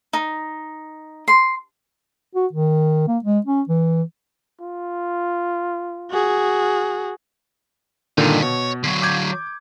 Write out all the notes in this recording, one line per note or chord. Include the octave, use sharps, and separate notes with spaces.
D#4
C6
F#4
D#3
A#3
G#3
C#4
E3
F4
F#4 G#4
G2 A#2 D3 D#3 D#4
B2 C#5
D3 F#3
D6 G6 G#6